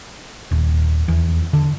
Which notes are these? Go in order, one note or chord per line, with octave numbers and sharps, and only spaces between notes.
D#1
E2
D3